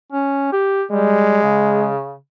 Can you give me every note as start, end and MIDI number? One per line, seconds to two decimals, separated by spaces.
0.12 0.53 61
0.53 0.83 67
0.91 1.39 55
0.91 1.92 56
1.43 2.16 49